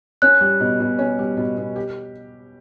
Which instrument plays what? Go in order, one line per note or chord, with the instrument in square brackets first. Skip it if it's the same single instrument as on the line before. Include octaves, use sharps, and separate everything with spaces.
[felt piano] C#4 [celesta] F#6
[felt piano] G3
B2
B2
C#4
G3
B2
B2
G4